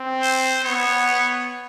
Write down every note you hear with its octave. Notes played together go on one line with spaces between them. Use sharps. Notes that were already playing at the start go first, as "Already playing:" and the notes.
Already playing: C4
C5
B3 C#5